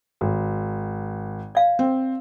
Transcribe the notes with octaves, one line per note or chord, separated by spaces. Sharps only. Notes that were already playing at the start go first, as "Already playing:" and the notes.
G#1
D5 F5
C4